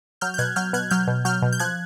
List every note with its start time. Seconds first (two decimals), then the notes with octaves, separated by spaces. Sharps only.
0.21 F#3 F6 G6
0.34 G6
0.38 B2 F#6 G#6
0.56 F#3 F6 G6
0.73 B2 F#6 G#6
0.91 F#3 F6 G6
1.08 B2
1.25 F#3 F6 G6
1.42 B2
1.53 G6
1.59 F3 F#6 G#6